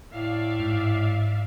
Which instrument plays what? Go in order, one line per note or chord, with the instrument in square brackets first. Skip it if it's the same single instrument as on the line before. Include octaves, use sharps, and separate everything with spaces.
[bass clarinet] A2 [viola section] D5 E5 F5
[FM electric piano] G#2